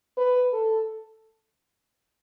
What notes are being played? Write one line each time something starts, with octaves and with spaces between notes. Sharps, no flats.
B4
A4